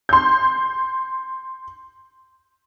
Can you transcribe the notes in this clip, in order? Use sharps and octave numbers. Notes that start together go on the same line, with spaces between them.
C6 G6